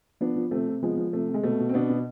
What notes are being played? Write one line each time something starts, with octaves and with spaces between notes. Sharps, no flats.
F3 B3 D4
F3
C3 A3 C4
C3
F3 G#3 B3
F3
C3 A3
C3
G#3
B2 A3
B2
C4
B2 B3 D4
B2